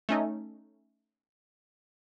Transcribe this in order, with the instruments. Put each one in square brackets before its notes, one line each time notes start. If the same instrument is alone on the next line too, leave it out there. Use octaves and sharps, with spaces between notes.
[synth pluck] A3 C#4 D#4